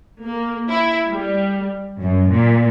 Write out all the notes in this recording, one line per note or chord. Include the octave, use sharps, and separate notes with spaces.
A#3
E4
G3
F#2
A#2